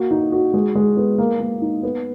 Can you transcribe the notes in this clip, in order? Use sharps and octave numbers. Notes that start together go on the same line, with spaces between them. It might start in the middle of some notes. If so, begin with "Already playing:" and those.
Already playing: A#3 F#4
D#4
F#4
G#3
G#3
B3
A#3
A#3
D#4
B3